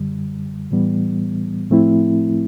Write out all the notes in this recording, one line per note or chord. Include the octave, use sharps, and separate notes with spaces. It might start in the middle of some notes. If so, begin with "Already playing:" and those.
Already playing: F#2 D3 G3
A2 E3 G3 B3
A2 F3 A3 C4 E4